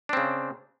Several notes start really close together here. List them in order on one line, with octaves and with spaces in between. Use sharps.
D4 C4 C#3